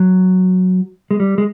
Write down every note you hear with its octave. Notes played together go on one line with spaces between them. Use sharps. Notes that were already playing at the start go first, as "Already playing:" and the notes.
Already playing: F#3
G#3
G3
G#3